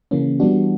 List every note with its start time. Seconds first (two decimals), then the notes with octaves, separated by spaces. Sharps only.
0.11 C#3 E3 A#3 C#4
0.40 E3 G3 B3 D4 F#4